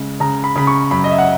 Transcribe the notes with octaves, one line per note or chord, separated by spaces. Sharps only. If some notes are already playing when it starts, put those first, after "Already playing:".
Already playing: C#3 G#3
C#3 A#5
B5
C#3 B5
C#6
F#2 B5
D#5
E5
F#5